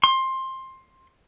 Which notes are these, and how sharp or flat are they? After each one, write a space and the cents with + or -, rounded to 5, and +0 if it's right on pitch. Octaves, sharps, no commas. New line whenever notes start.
C6 +15